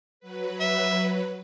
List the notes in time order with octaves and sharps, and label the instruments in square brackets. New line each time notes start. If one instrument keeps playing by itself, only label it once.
[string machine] F#3 B4
[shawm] E5